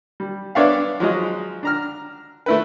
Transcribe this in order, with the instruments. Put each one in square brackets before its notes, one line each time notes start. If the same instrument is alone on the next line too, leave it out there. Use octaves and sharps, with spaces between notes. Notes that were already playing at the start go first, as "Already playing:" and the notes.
[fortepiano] G3
B3 D4 C#5 D5 E5 F5
F3 F#3 G#3 D#5
D4 A#5 F6
A3 E4 B4